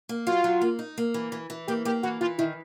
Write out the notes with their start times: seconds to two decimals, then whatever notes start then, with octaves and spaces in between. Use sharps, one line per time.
0.09 A#3
0.27 F#3 F4
0.44 F#3
0.61 A#3
0.79 D#4
0.98 A#3
1.14 E3
1.32 E3
1.50 E3
1.67 A#3 G4
1.85 A#3 G4
2.03 E3 F#4
2.21 E3 F4
2.38 D#3 E4